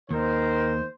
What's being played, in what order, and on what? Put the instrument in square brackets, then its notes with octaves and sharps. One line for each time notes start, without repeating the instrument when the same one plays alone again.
[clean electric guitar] D#2 [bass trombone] D#3 [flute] A#4 [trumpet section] C5